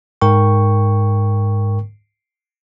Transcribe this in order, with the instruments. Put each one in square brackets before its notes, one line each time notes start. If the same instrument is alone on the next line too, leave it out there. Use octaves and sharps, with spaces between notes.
[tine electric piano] G#2 A#4 G5 C#6